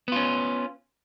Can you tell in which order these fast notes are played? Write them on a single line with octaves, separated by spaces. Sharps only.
B3 F4 C#4